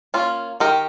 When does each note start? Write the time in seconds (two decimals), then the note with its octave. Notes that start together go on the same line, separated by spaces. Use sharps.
0.14 A#3 C#4 F4
0.60 D#3 G4 A#4